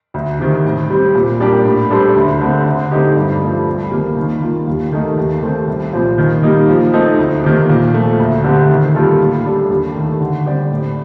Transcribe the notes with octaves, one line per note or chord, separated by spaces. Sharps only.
D2
C3 D#3
A2
G3 C4
A#2
G3 D4 G4 A#4
A2
G3 D4 A4 C5
D2
D3 A3 C4
D3
A3 C4 D#4 G4
G2
F3 A3
C2
C3 D#3 G3 A#3
D#3
A#3 F4
D#2
D#3 A3 D#4 A#4
D#2
D#3 A3 C4
C2
A#2 F3 C4
D#3
G3 A#3 D#4
F3
A3 C4 D#4 A4
D2
C3 D#3 A#3
A#2
F3 A3
D2
D3 A3 C4 G4
D#3
G3 A#3 F4 A4
A2
G3 D4 A4
D#2
D#3 A3
D3
G3 C4 G4 D5
A2